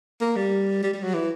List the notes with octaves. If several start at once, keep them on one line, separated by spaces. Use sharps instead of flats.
A#3
G3
G3
G3
F#3
E3